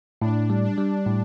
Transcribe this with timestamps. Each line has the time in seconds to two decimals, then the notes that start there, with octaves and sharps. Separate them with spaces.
0.21 A2 D4
0.50 G3
0.65 D4
0.78 G3
1.07 A2